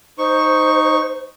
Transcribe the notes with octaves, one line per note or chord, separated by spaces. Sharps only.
D#4 C5 C#6